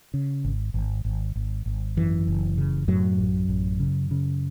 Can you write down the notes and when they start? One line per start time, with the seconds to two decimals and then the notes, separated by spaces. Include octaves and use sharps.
0.14 C#3
0.44 G#1
0.74 G#1
1.05 G#1
1.36 G#1
1.66 G#1
1.97 F#2 E3
2.27 F#1
2.58 C#3
2.88 F#2 A2 F#3
3.18 A1
3.49 A1
3.80 C#3
4.11 C#3